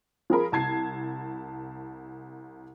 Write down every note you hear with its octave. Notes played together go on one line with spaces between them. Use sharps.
F3 G#4 A#4 B5
C2 A5 G#6 C7